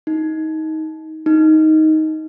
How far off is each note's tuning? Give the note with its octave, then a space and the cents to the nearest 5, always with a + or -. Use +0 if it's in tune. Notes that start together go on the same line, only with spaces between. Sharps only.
D#4 +20
D#4 +10